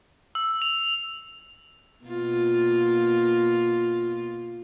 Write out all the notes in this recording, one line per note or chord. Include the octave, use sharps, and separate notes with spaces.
E6
F7
B2 A#3 F4